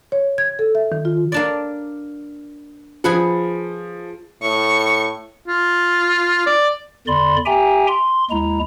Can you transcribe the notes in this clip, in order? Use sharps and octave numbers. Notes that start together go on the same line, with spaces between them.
C#5
G#6
A4
E5
D#3
F4
A#3 D4 D5
F3 G#4 B4 F#5
A2 C#6
F4
D5
E2 D3 D5 B5 C6
G4 E5 G5 G#5 A#5
C6
D#2 G#3 E4 A#5